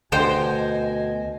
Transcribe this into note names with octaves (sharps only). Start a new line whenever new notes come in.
D2 B2 D3 C5 D#5 G5 G#5